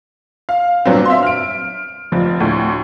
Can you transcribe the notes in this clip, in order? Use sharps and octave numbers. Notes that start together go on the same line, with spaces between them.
F5
G2 A#2 F#3 B3 C4
E5 F5 C6
F6 D7
F1 F3 D5
D2 A2